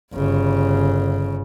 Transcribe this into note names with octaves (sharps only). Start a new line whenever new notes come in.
G1 C#3